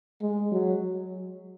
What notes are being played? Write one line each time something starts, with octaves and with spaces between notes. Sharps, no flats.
G#3
F#3